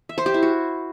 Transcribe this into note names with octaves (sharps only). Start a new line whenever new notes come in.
E5
C5
G4
E4
F#4